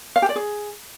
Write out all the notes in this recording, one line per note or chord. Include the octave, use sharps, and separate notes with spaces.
F5
G4
D5
G#4